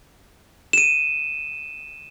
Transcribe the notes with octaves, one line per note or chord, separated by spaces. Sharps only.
D#7 E7